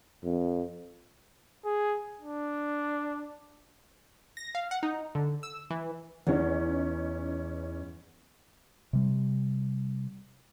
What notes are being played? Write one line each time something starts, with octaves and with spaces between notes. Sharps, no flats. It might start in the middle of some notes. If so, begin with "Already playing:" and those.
F2
G#4
D4
A#6
F5
F#5
D#4
D3
E6
E3
E2 E3 C#4 D#4
C3 G3